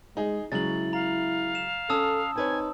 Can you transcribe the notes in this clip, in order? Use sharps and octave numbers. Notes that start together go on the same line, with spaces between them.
G#3 D#4 G#4
C#3 F#3 G#3 E4 A6 F#7
F5 A#5
E7
C#4 A4 A5 D#6 E6
C4 D#4 B4 C#5 G#5